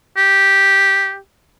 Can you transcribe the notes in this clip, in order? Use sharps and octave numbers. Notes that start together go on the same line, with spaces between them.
G4